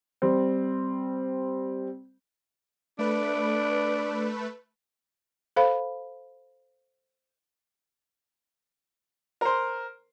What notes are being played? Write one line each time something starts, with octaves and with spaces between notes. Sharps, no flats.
G3 C4
A3 D4 B4
A4 C5 F5 B5
A#4 C5